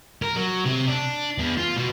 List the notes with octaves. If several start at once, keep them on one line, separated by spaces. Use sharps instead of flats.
A#4
F#3
C3
D4
E2
F4
B2